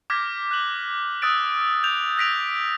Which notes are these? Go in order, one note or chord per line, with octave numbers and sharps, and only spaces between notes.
D6 F6 G6 G#6 A#6 B6
F#6 F#7
D#6 E6 F#6 A6 D7
G6 F7
E6 F#6 A#6 B6 D7 F7